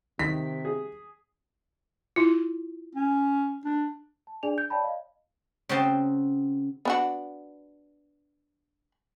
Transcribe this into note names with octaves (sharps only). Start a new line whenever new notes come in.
C3 D#3 B6
G#4
E4 F4
C#4
D4
A5
D4 G#4 D5 G#5 F7
G6
C#5 D5 G5 A5 B5
D#5 F5
C#3 C4 F#4 D#5 G5 A5
B3 D4 F#4